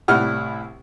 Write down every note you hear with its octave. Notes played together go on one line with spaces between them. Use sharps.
C2 A2 G3 E4 F#5 F6